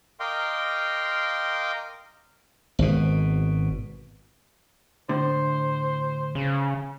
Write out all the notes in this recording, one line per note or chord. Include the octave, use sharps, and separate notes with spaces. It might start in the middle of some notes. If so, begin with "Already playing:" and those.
A#4 D#5 F5 G5 C6 D6
G#1 B2
A2 D3 C5
C#3